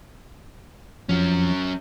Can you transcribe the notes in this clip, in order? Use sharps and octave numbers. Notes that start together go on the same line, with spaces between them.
F2 F#3 C#4